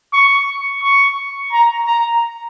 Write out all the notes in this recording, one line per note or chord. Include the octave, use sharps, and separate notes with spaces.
C#6
C#6
A#5
A#5